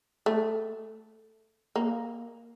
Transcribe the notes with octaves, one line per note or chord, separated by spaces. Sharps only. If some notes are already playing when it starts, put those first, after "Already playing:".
A3
A#3